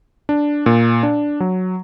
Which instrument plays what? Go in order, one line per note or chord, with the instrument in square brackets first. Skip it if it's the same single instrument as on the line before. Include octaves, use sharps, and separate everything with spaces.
[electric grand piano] D4
A#2
D4
F#3